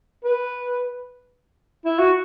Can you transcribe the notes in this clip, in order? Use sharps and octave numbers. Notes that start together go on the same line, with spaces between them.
B4
E4
F#4